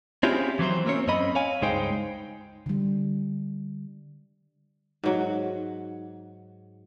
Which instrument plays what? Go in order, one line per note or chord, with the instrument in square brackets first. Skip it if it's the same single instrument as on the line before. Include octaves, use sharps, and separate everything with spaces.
[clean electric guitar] C4 C#4 E4 F4 G4 G#4
E3 F#3 C4 C5
A#3 C4 C#4 C#5
F#2 C4 C#4 D#5 B5
C#5 F5 G#5
C#2 G2 G#3 D#4 C5 G5
[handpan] D3 G3
[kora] G#2 F#3